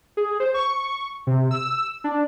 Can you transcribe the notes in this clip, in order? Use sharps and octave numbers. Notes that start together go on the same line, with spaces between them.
G#4
C5
C#6
C3
E6
D4